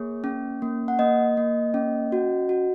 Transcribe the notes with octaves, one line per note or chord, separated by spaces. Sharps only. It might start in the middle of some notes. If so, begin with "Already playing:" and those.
Already playing: A#3 G#4 C#5
C#4
A#3
F#5
A#3 D#5
A#3
C#4
F#4
F#4